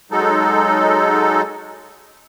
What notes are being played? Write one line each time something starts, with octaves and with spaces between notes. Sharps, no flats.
F#3 G#3 D#4 A4